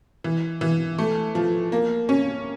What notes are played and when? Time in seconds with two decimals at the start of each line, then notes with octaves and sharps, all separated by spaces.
0.24 E3
0.61 E3
0.98 A3
1.35 F3
1.72 A#3
2.09 C#4